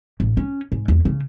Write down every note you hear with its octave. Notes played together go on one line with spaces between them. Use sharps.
A1
C#4
G#2
E2
C#3